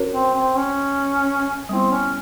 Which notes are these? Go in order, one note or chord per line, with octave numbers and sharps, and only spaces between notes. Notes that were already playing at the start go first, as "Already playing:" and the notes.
Already playing: C#4 F#4 A#4 C#5
C4
C4
C#4
G3 B3 C4 E4
C#4